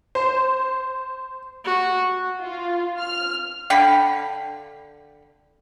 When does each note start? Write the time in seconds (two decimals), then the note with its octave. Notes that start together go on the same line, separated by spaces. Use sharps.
0.15 C5
1.65 F#4
2.40 F4
2.99 F6
3.70 D3 F5 G5 B5